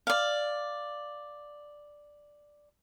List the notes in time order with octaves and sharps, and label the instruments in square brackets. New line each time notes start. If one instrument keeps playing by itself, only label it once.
[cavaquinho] D5 F5